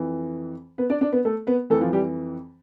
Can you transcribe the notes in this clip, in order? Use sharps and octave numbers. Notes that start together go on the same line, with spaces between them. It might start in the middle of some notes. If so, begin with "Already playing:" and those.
Already playing: F2 E3
B3 B4
D4 D5
D4 D5
B3 B4
A3 A4
B3 B4
F2 E3 A3 A4
F3 F4
G3 G4